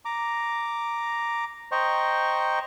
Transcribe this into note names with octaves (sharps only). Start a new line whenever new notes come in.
A#5 D6
C5 D#5 G5 A#5 C#6